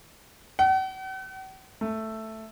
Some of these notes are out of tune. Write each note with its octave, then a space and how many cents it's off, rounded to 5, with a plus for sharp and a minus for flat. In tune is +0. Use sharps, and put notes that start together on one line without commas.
F#5 +45
A3 +5